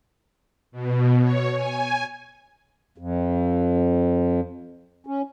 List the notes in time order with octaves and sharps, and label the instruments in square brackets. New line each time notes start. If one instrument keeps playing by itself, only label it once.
[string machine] B2
C#5
G#5
[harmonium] F2
C#4